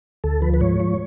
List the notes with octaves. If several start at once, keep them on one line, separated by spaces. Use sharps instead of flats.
D2 A4
F3 B4
B4
G#2 C#5
F3